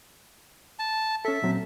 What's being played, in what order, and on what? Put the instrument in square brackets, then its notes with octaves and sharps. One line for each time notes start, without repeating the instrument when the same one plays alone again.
[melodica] A5
[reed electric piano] C#4 A4 [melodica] E5
[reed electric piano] A#2 F#3 C4